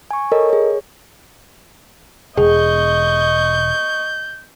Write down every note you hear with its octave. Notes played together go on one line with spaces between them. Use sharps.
G#5 C#6
A4 A#4 C#5 D#5
G#4 C#5
E1 G#4 D#5 C#6 G6